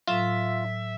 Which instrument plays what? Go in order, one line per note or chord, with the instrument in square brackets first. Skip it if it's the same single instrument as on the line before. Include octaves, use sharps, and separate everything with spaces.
[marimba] A2 F#3 [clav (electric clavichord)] F4 [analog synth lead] E5